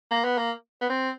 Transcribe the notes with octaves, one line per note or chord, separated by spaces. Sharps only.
A#3
B3
A#3
B3
C4